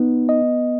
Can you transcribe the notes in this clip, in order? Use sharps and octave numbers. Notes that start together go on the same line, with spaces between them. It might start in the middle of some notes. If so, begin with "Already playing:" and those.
Already playing: B3 D#4
D#5